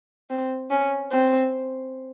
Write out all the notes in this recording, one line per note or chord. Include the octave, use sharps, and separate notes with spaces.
C4
C#4
C4